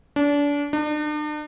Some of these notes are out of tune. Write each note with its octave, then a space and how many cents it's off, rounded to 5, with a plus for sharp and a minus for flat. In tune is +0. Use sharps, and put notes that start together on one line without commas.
D4 -30
D4 +40